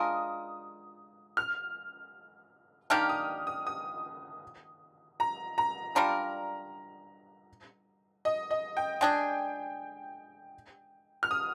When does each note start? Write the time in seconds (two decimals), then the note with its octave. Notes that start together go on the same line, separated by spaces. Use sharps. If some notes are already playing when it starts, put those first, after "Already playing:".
Already playing: G#3 D4 F4 A#4 D#6
1.37 F6
2.90 D#3 A#3 D4 G4 F6
3.09 D#6
3.47 D#6
3.67 D#6
5.20 A#5
5.58 A#5
5.95 G3 D4 F4 A#4 A#5
8.25 D#5
8.51 D#5
8.77 G5
9.01 G#3 D4 G#4 G5
11.23 F6
11.31 D#6